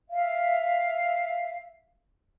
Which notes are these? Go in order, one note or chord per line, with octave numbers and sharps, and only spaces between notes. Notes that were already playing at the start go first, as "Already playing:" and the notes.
E5 F5